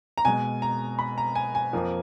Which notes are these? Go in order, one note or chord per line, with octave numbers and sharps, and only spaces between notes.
A#5
B2 G#3 G#5
A#5
B5
A#5
G#5
G#5
F2 F3 A#3